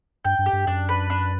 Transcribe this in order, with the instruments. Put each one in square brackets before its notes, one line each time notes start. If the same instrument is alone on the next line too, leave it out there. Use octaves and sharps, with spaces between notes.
[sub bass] G2 [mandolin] G5
[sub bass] G2
[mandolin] G4
[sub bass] G2
[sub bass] F#2 [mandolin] D4
[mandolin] B4
D4